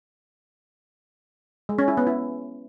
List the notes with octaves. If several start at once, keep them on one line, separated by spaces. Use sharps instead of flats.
G#3
C#4
E4
B3
E4